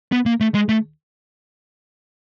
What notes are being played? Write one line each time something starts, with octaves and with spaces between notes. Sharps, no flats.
B3
A#3
A3
G#3
A3